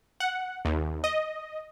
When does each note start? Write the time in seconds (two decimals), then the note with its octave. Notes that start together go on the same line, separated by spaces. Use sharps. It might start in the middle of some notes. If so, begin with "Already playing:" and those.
0.20 F#5
0.65 D#2
1.04 D#5